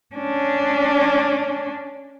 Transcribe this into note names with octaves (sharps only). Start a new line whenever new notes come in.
C#4 D4